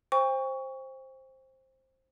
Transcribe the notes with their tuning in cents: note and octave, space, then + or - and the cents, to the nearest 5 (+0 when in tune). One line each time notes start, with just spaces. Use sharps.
C5 +10 G5 +40 C#6 +20